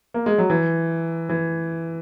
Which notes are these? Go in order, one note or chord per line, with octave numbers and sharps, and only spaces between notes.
A#3
G#3
F#3
E3
E3